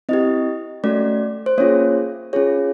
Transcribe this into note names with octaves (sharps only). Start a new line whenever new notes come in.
C4 E4 G4 D#5
A3 C#4 F#4 D5
C5
A#3 C#4 F4 G#4 C#5
C#4 F4 G#4 C#5